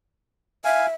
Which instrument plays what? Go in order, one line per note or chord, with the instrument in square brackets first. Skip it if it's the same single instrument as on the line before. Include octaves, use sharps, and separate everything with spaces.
[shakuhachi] E5 [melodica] F5 G#5